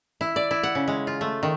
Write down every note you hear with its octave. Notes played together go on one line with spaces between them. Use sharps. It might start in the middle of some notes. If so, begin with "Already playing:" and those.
E4
D5
E4
F#5
C#3
G#3
F4
A3
D#3